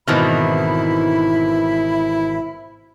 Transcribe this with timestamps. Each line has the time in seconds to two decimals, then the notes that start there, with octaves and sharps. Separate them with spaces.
0.08 G#1 B2 D#3 E3 E4 C5 B5 F6